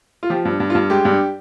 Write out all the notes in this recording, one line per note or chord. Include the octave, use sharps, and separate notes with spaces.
F4
F3 G4
G2
G2
F4
G2
G#3 G4
G2